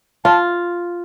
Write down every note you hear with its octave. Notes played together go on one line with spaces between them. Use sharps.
F4 A5